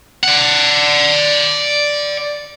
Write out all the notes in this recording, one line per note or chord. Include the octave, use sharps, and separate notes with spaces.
D5 F#5